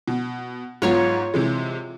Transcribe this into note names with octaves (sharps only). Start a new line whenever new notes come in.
B2
G#2 F#3 B3 F4 C#5 C#6
C3 E3 G#3